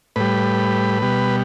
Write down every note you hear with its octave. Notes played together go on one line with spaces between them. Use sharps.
A2 G3 B4
B2 G3